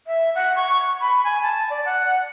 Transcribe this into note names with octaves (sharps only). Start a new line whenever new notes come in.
E5
F#5
C#6
B5
G#5
A5
D5
F#5